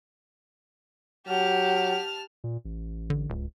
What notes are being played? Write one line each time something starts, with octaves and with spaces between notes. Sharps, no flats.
F#3 G4 F#5 A5 F6
A#2
A1
D3
D1 C#2